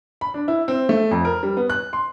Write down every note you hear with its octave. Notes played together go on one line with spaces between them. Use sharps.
B5
D4
E4
C4
A3
F2
A#4
G3
B3
F#6
C6